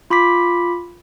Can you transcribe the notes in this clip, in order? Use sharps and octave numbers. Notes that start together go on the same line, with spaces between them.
F4 B5 D6 B6